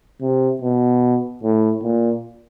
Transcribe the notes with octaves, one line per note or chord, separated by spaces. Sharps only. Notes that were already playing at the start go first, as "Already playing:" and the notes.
C3
B2
A2
A#2